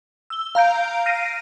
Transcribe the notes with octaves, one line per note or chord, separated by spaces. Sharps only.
E6 G7
F5 A#5 G6 D7
F6 A#6 C7 D7 D#7